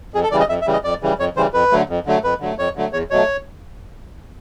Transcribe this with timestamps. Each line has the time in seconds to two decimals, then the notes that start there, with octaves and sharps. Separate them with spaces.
0.14 F2 G#4
0.23 A4
0.31 C#3 E3 G3 D5
0.40 D#5
0.49 F2 E5
0.61 E5
0.67 C#3 E3 G3
0.73 D#5
0.84 F2 D5
1.02 C#3 E3 G3
1.19 F2 C#5
1.36 C#3 E3 G3 C5
1.54 F2 B4
1.72 D3 F#3 A3
1.89 F2
2.06 D3 F#3 A3
2.24 F2 B4
2.40 D3 F#3 A3
2.58 F2 C#5
2.76 D3 F#3 A3
2.93 E2 C#5
3.11 B2 F#3 A3 C#5